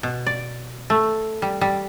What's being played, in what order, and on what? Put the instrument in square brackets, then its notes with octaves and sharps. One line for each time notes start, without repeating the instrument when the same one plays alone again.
[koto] B2
D5
A3
G3
G3